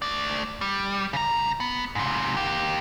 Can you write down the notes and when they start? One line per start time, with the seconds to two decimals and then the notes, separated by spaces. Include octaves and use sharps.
0.02 A3 D5
0.61 G3
1.13 C#3 A#5
1.60 B3
1.95 G#2 C3
2.37 A#3 G4